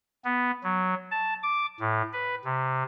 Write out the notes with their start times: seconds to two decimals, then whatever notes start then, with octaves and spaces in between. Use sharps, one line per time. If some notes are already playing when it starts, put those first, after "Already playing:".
0.24 B3
0.64 F#3
1.11 A5
1.43 D6
1.80 A2
2.13 B4
2.45 C3